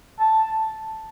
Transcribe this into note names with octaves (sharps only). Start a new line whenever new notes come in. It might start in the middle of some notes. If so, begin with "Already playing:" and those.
A5